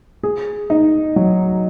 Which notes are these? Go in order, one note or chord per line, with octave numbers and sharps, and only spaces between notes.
G#4
D#4
F#3